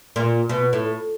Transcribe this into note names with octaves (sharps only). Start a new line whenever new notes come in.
A#2
B2
A2